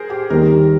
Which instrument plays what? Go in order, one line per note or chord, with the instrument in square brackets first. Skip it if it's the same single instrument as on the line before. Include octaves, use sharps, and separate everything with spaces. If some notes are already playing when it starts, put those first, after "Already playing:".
Already playing: [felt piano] G#4 A#4 C5
G4
[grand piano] D#2 D#3 G3 [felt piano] A#4